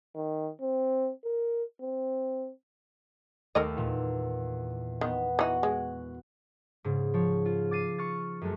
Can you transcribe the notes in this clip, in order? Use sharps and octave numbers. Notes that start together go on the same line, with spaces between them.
D#3
C4
A#4
C4
D#2 A3 A4 A#4 D#5
E2 A#2
D#3 B3
E3 D#4 F#4
G#3
G#2 C#3
F3 C#5
F4
D6 A6 C7 D#7
C#6 F6 A6
F#2 G#3 A3